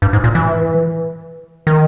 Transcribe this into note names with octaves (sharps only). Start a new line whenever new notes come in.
G2
G#2
A#2
E3
D#3